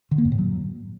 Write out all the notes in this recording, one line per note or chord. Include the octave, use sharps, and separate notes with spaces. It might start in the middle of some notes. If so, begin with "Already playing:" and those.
D3
A#3
F#2
A2
F#3